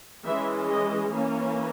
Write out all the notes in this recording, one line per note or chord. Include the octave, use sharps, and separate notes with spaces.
E3 G#3 C#4 E5
D#5
E3 A#3 C#4